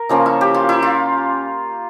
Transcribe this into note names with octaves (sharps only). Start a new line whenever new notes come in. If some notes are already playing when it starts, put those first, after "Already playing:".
Already playing: A#4
C#3 F3 A#3 C#4 F4
E4
G4
F4
E4
F4